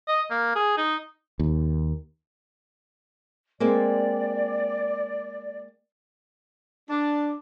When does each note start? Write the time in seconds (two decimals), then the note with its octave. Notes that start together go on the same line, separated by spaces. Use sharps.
0.08 D#5
0.31 A#3
0.55 G#4
0.78 D#4
1.39 D#2
3.60 G#3 A#3 C4 D5
6.89 D4